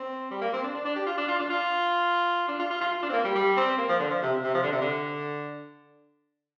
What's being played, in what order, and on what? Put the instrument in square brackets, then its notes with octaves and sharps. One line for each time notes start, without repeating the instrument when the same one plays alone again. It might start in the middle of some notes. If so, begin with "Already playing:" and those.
Already playing: [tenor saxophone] C4
G3
A#3
C4
D4
D4
D4
G4
F4
D4
F4
D4
F4
D4
F4
F4
F4
F4
D4
C4
A#3
G3
G3
C4
A#3
F3
D3
F3
C3
C3
F3
D3
C3
D3